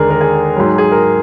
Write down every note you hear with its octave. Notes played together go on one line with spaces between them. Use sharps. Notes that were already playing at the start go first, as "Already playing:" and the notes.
Already playing: D#2 D3 G#3 G#4 A#4
A#4
G#4
G#2 F#3
G#4
A#4